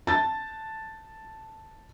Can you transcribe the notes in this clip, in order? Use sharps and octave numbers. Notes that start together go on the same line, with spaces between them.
A5 A6